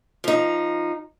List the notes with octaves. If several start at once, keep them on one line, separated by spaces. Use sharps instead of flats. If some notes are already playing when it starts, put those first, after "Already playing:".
F3 D#4